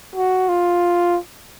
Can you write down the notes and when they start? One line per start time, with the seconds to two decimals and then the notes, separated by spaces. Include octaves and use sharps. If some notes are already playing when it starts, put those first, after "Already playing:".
0.16 F#4
0.49 F4